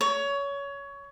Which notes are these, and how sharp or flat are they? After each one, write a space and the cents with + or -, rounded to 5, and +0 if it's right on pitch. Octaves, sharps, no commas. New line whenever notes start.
C#5 +20